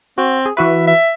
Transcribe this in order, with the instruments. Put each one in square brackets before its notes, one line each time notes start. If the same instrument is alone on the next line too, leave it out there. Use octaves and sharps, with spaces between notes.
[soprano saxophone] C4 [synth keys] F#4
[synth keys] G#4
[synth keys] E3 F#4 B4 [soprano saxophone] E5
[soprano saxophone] E5